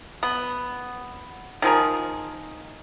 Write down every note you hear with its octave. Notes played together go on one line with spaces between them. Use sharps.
B3
D#3 F3 G#4 A#4